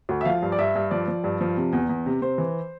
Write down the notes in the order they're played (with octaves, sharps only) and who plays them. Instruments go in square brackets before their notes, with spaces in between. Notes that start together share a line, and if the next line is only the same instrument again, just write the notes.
[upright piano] D2
E5
F3 F5
G2
D5
G2 E5
G2
F3 D5
F3
G2
F3
C3
E2
E2
C3
C3 C5
E3